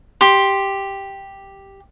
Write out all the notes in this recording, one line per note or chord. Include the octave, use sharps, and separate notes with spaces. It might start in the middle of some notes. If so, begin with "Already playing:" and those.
G4 C6